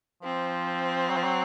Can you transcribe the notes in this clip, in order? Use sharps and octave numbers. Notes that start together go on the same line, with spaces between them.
F3 C4
F#3
F3
F#3